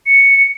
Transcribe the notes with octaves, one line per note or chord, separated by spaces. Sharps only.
C#7